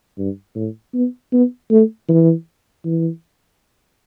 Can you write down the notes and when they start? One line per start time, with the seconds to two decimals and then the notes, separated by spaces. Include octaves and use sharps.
0.18 G2
0.56 A2
0.94 B3
1.32 B3
1.71 A3
2.09 E3
2.85 E3